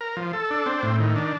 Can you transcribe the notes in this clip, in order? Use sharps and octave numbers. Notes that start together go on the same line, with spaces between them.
A#4
F3
A4
D4
C4
A2
D#3
D4